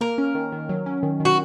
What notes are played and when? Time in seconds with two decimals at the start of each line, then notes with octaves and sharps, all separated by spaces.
0.01 A#3 A#4
0.18 C#4
0.35 D#3
0.52 D#3
0.69 F#3
0.86 C#4
1.03 D#3
1.20 D#3
1.25 F#4